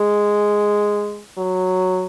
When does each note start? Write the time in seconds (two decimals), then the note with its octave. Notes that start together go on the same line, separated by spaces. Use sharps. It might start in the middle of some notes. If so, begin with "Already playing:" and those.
Already playing: G#3
1.38 F#3